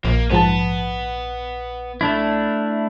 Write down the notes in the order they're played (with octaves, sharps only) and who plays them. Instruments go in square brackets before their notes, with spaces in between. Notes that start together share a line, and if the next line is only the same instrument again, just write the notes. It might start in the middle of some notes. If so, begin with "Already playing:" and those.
[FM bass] A#1 [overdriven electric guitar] A#3
[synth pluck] G#2 F3 A5 [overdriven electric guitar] B3
[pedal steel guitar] A3 D4 E4